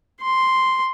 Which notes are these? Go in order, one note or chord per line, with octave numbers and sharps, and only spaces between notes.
C6